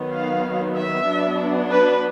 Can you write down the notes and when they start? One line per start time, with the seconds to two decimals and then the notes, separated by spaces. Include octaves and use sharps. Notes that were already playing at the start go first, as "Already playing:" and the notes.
Already playing: D#3 F#3 B3
0.12 F5
0.76 E5
1.07 F#3 B3 D4
1.70 B4